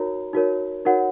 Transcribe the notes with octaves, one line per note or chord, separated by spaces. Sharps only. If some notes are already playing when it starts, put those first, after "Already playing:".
Already playing: D#4 F#4 A#4 C#5 A#5
D#4 F#4 A#4 C#5
D#4 F#4 A#4 C#5 F#5